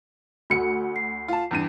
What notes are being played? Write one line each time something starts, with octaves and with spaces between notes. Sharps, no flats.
D2 F#4 C#7
C7
F4 A5
E2 G2 D#7